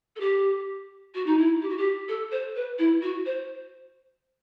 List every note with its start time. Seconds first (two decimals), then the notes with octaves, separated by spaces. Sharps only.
0.16 A4
0.20 G4
1.14 F#4
1.26 D#4
1.38 E4
1.62 G4
1.69 F#4
1.77 G4
2.08 A4
2.31 C5
2.55 B4
2.78 E4
3.02 F#4
3.26 C5